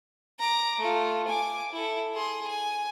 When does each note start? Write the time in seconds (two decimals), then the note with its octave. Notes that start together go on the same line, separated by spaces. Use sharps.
0.39 A#5 D6
0.79 A3 F4
1.28 G#5 D6
1.72 E4 A4
2.14 G#4 C6
2.48 G#5